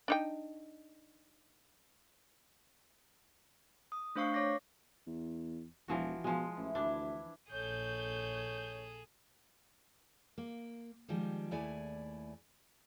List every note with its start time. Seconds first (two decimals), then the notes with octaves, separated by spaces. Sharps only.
0.08 D4 D#4 G5
3.92 D#6
4.16 A3 D4 C5 F5 C#6 C7
4.34 C#5 D6 A#6
5.06 E2
5.88 E1 E3 F3 F#4
6.24 B2 F3 G#3
6.57 A1 E3
6.75 D2 D4 E4
7.52 A#1 G#4 A4 C#5 G6
10.38 A#3
11.08 D#3 F3 G3 G#3
11.51 D#2 A3 E4 G#4 D5 G#5